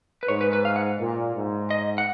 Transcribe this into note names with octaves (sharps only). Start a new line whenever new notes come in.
B4
G#2 C#5
B4
B4
F5
F#5
A#2
G#2
D#5
F#5